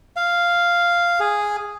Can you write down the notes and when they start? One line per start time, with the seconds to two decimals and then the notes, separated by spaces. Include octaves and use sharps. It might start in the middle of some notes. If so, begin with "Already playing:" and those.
0.17 F5
1.20 G#4